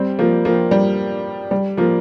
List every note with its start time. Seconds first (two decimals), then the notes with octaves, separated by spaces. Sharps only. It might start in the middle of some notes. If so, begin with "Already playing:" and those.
Already playing: G3 C4
0.19 F3 A#3
0.45 F3 A#3
0.71 G3
1.51 G3
1.77 F3 A#3